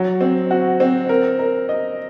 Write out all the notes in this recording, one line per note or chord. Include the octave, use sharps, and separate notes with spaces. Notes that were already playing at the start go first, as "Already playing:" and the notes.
Already playing: F#3
C4
F#4
C4
A#4
A#4
D#5